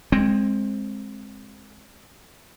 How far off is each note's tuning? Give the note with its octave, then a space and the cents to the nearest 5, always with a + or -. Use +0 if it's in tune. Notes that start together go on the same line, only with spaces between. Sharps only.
G#3 +0 C4 +15